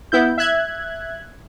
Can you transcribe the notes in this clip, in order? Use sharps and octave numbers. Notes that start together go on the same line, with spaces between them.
B3 E4 G6
E5 F#6 G#6